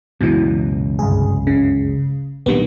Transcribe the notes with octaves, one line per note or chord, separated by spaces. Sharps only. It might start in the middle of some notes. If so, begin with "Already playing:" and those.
C#2 F#2 B2 E3
G1 C2 G#4
G1 C#3
B1 A#2 D#3 G3 B3 D4